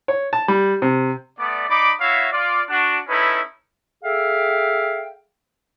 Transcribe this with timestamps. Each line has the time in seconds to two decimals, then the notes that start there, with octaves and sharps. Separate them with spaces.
0.08 C#5
0.33 A5
0.48 G3
0.82 C3
1.39 A3 B3 D5
1.68 D#4 D5 B5 D6
2.00 E4 F#4 C#5 E5 F5
2.32 F4 D5
2.70 D4 F#4
3.08 C#4 D#4 E4 A4 B4
4.04 G#4 A4 E5 F5 G5